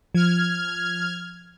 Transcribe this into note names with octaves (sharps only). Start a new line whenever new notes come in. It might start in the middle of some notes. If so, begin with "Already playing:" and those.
F3 F6 G#6